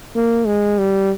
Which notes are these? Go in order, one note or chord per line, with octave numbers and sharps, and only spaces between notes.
A#3
G#3
G3